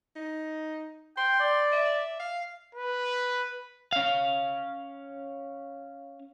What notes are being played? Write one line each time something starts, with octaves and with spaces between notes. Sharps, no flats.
D#4
G5 C6
D5
E5
F5
B4
C#4 F5